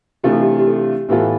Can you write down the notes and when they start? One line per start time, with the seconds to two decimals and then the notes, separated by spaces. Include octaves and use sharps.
0.24 C3 E3 A3 D4 F4 G4
0.32 A4
0.41 G4
0.50 A4
0.59 G4
0.68 A4
0.77 G4
1.09 A2 E3 B3 F4 G4 A4